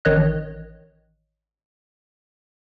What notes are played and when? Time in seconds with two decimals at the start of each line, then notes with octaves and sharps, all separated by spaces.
0.05 A1 D#3 C#5 D#5 F#6